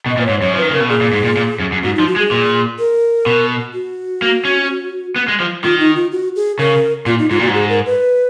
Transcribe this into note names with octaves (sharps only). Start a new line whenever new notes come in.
B2
D#5
A#2
B4
G#2 C#5
F#2 C#5
F3
D#3 B4
C#3 A#4
B2
A#2 G#4
A#2
G#2
A#2
A#2
F#2
F#2
G#2 F#4
D#4
F3
F#4
G#3
G#4
A#2
A#4
B2
F#4
A#3
C#4
B3
G#3
F3
D#3 F4
D#4
F4
F#4
G#4
C#3 A#4
A#2 F4
D#4
G#2 F4
A#2 F#4
G#2
G#4
A#4
B4